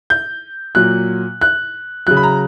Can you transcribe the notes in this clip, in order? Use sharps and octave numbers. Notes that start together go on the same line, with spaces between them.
G6
A#2 F#3 F#6
F#6
C#3 F#3 F#6
B5
A#5